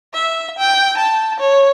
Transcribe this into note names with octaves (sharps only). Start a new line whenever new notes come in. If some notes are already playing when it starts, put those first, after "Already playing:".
E5
G5
A5
C#5